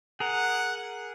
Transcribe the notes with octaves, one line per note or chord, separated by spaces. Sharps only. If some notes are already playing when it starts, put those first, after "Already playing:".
G#4 A#4 F#5